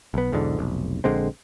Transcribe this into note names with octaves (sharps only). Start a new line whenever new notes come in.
B1 B3
B1 E2 G#2 D3
F1 B1
A#1 D3 G#3 C4